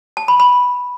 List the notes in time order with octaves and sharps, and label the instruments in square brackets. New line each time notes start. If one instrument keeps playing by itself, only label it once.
[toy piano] A5
B5
B5